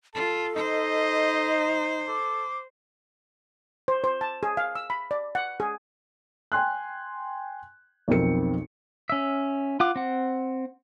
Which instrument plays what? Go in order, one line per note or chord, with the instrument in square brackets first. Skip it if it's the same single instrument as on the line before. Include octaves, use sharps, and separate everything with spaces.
[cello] F4 [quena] A4 [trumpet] A5
[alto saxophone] D#4 [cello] C5 [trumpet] D#5
[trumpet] A4 [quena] D6
[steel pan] C5
C5
A5
G#4
F5
E6
B5
D5
F#5
G#4
[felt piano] G5 G#5 C6 F#6
B1 F2 C4 A#4 C#7
[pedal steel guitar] C#4 E5
F4 F#5 D6
C4 F#5